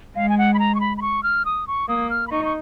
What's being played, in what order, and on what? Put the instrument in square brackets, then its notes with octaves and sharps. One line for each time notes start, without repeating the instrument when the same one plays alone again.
[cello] G#3 [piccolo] F5
[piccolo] G#5
F#5
B5
A#5
C#6
B5
B5
C#6
F6
D#6
C#6
[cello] A#3 [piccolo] D#6
[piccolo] F6
B5
[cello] D#4 [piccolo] C#6
[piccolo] C#6